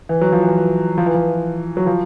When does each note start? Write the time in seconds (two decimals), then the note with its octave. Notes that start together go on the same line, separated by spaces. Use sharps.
0.09 E3
0.21 F#3
0.33 F3
0.43 E3
0.98 F3
1.06 E3
1.14 F3
1.77 F#3
1.87 F3